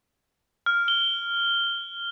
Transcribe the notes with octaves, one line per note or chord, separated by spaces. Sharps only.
F6
G7